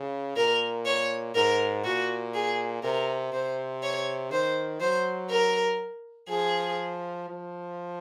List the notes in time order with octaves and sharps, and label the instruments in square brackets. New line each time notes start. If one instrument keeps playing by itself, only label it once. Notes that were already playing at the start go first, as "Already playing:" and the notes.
Already playing: [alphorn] C#3
[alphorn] A#2 [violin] A#4
[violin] C#5
[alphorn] G#2 [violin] A#4
[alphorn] A#2 [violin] F#4
[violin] G#4
[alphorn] C3 [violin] A#4
[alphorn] C3 [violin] C5
[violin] C#5
[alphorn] D#3 [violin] C5
[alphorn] F#3 [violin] C5
[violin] A#4
[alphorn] F3 [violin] G#4
[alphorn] F3